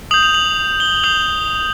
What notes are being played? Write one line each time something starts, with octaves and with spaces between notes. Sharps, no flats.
D#6 G6 F#7
F7
F#7
G7
D#6 G6 F#7